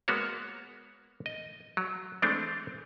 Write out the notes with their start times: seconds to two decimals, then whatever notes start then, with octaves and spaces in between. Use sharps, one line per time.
0.08 G#3 A#3 B3 F#4 C#5
1.26 D#5
1.77 F#3
2.22 E3 G#3 A3 C4 D4